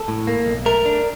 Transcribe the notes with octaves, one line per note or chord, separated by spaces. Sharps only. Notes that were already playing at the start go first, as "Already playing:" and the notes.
Already playing: A4
A2
A#3
B1
A3 A#4
D4